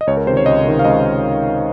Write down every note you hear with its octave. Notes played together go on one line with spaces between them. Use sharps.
D#5
C#2 C#5
A#4
C3 D#3 C5
C#5
C#2 D#5
C3 D#3
F5
C#2 D#5